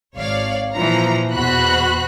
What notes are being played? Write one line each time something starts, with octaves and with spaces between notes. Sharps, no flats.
G#1 C#5 D5 F5
A#2 E3 F3 A#5
E2 B2 F#4 C5 B5 F#6